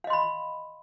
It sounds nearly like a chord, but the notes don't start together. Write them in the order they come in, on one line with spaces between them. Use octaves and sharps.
F5 D#5 C6 B5